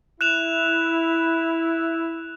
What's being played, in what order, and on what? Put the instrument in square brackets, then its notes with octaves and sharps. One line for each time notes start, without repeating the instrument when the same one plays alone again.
[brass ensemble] E4 [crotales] F#6 E7 F7